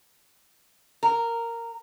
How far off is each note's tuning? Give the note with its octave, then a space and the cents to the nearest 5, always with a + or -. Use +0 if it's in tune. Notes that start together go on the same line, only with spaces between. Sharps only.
A#4 -10